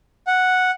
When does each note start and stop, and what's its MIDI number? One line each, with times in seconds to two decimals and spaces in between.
0.27 0.71 78